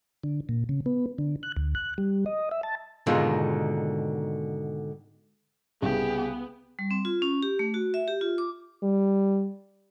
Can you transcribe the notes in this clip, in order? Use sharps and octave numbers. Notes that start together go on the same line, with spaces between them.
D3
A#2
C#3
B3
D3
F#6
D2
F#6
G3
D#5
E5
A5
G#2 B2 D3 D#3 A#3 F4
C2 C#3 B3 G4 G#4
G3
C4
F4
C#4
G4
A3
F#4
E5
G4
F4
D6
G3